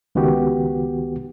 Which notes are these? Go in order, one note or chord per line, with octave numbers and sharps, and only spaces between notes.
C#2 D#3 B3 F#4 G4